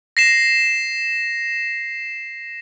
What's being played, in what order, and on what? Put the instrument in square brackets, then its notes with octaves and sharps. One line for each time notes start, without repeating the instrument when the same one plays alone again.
[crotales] A#6 C7 E7